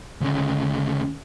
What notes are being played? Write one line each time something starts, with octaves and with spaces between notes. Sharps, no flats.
D2 C#3